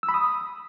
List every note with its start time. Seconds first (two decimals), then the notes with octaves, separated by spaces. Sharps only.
0.03 E6
0.09 B5
0.14 D#6